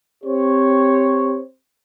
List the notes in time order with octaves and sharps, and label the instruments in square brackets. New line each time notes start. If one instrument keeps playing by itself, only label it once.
[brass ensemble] C4 G4 C5 C#5